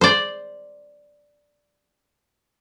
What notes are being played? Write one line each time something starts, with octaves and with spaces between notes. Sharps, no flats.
C5 D5